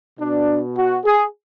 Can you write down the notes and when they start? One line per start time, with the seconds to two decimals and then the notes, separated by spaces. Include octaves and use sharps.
0.20 B2 D4
0.76 F#4
1.05 G#4